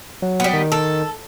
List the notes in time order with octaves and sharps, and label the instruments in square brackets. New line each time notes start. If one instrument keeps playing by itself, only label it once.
[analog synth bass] F#3
[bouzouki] G3 B3
[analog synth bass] D#3
[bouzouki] A4